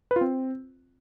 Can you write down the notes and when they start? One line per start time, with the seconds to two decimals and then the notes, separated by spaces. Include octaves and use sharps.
0.11 B4
0.16 F4
0.21 C4